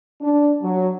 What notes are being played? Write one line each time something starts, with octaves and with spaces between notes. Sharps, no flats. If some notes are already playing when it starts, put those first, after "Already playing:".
D4
F#3